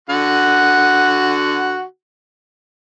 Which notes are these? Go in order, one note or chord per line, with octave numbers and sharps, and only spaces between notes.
D3 F#4 F#5